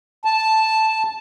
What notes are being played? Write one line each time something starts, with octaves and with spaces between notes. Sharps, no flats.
A5